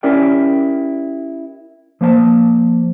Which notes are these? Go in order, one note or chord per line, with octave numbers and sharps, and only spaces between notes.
C#4 E4 G4 A#4 D5 G5
F3 A#3 C5 A5